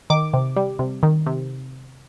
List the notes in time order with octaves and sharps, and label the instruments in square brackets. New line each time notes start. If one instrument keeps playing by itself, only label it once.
[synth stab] D#3 D6
C3
G3
C3
D#3
C3